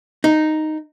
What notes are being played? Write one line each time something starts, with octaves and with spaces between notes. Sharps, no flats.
D#4